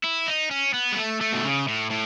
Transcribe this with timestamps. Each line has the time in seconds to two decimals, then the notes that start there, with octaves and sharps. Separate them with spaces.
0.04 E4
0.28 D#4
0.51 C#4
0.74 B3
0.92 G#3
0.97 A3
1.21 A3
1.33 B2
1.44 C#3
1.68 A2
1.91 A2